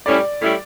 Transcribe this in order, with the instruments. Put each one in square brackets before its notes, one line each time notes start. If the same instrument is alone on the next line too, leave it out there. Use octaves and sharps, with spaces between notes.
[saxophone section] A2 G3 C#4 E4 [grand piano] D5
[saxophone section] A2 G3 C#4 E4